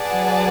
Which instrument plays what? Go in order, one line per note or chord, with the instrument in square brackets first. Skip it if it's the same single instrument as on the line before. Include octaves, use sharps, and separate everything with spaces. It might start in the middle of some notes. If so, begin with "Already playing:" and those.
Already playing: [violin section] G#4 B4 D5 F#5 A5
[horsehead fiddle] F#3